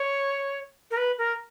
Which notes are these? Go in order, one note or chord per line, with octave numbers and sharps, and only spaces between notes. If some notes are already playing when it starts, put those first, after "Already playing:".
Already playing: C#5
A#4
B4
A#4